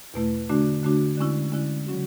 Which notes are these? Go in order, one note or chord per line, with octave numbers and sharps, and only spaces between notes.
E2 B2 A3 E4
D3 A3 D4 F#4
D3 A3 D4 F#4
D3 G#3 C#4 E4
D3 G#3 C#4 E4
C#3 F#3 C#4 F#4